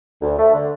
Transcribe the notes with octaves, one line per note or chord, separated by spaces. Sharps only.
D2
A3
D3